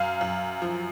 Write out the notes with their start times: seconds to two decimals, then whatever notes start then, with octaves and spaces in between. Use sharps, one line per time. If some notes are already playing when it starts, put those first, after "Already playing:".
Already playing: F#2 F5
0.21 F#2
0.62 F3